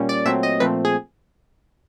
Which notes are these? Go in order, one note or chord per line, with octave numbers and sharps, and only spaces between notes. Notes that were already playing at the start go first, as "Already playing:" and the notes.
Already playing: A#2 G3 A#3 C#4
D5
A#2 F#3 A3 C4 E5
D#5
A#2 F3 A3 C4 B4
G#4